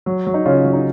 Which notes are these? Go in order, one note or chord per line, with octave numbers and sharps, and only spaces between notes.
F#3
F#3
D#4
C#3 C#4 F4
F#3
D#4